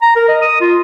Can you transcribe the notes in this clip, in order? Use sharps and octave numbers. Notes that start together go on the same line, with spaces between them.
A#5
A#4
D#5
D#6
F4